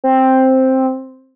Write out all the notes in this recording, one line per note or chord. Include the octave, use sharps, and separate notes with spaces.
C4